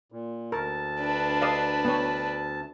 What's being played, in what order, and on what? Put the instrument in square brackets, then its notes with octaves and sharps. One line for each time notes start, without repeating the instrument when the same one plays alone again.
[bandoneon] A#2
[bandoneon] D2 A5 [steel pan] A#4
[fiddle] D4 B4
[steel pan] D5 D#5 F5
B3 C#5